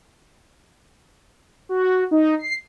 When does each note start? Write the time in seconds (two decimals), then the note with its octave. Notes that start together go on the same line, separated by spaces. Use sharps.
1.69 F#4
2.11 D#4
2.39 C7